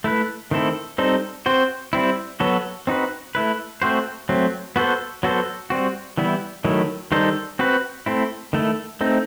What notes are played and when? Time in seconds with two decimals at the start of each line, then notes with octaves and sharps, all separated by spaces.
0.04 A3 E4 B4
0.51 D#3 A3 C4 E4 A4
0.98 G3 C4 D#4 A4 C5
1.46 C4 F#4 C5
1.93 G3 C4 E4
2.40 F#3 B3 F#4 A4
2.87 C4 D#4 F#4 B4
3.35 A3 E4 B4
3.82 A3 C4 F#4 C5
4.29 F#3 A3 C4
4.76 B3 F#4 A4 C5
5.23 F#3 B3 F#4 A4 C5
5.70 G3 C4 F#4
6.17 E3 G3 B3 E4
6.65 D#3 F#3 A3 E4
7.12 D#3 G3 D#4 A4 C5
7.59 C4 F#4 B4
8.06 A3 C4 E4
8.53 D#3 A3 E4 A4
9.01 A3 C4 D#4